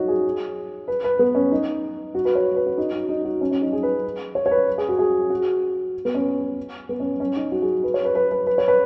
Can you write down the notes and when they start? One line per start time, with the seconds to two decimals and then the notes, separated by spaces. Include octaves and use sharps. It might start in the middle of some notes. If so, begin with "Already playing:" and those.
Already playing: D#4 F#4 C#5
0.08 G#4
0.88 B4
1.04 B4
1.19 B3
1.35 C#4
1.51 D#4
2.15 F#4
2.25 B4
2.35 C#5
2.56 B4
2.67 F#4
2.78 D#4
2.93 F#4
3.09 D#4
3.25 F#4
3.41 C#4
3.51 C#4
3.62 D#4
3.73 G#4
3.83 B4
4.35 C#5
4.46 C#5
4.51 B4
4.78 G#4
4.89 F#4
4.99 G#4
5.30 F#4
6.05 B3
6.15 C#4
6.89 B3
7.00 C#4
7.20 C#4
7.36 D#4
7.52 F#4
7.62 G#4
7.84 B4
7.94 C#5
8.05 B4
8.15 B4
8.31 B4
8.47 B4
8.58 C#5
8.68 B4